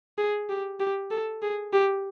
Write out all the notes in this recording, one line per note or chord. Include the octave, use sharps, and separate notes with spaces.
G#4
G4
G4
A4
G#4
G4